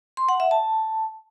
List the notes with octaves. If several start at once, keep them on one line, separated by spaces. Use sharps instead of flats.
C6
F#5
E5
A5